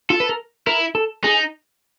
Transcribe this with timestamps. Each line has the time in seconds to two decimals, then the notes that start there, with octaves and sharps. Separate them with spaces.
0.10 F4 A4
0.20 B4
0.29 A#4
0.67 E4 A#4
0.95 A4
1.24 D#4 G#4